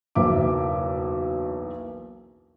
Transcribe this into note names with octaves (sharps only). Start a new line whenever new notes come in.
F#1 B1 E2 A#3 E5 D6